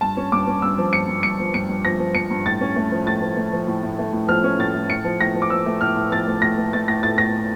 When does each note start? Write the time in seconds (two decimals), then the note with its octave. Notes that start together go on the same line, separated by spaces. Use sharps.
0.01 G2 A5
0.17 C#4
0.32 G2 D6
0.47 C#4
0.62 G2 E6
0.78 F3
0.93 G2 C#7
1.08 G2
1.23 G2 C#7
1.39 F3
1.54 G2 C#7
1.69 G2
1.85 F3 A#6
1.99 F3
2.15 F3 C#7
2.31 G2
2.46 A2 A6
2.61 C#4
2.76 A3
2.92 F3
3.06 A2 A6
3.22 F3
3.37 A3
3.53 F3
3.68 A2
3.83 A2
3.99 A3
4.13 A2
4.28 F3 F6
4.44 C#4
4.59 A2 A6
4.74 A2
4.89 A2 C#7
5.05 F3
5.21 A2 A#6
5.35 F3
5.42 D6
5.50 F3 E6
5.66 A3
5.81 A2 F6
5.96 A2
6.11 F3 A6
6.28 A3
6.42 A2 A#6
6.58 A3
6.73 A3 A6
6.88 A2 A#6
7.03 A2 A6
7.18 A2 A#6